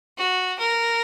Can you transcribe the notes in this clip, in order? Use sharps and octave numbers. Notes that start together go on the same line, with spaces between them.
F#4
A#4